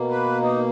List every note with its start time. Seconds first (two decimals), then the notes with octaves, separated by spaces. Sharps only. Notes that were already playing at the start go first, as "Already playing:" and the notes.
Already playing: B2 A#3
0.10 B4
0.42 D#4